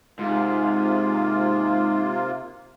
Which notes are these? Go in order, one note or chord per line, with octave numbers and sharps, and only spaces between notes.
G#2 C3 A#3 F4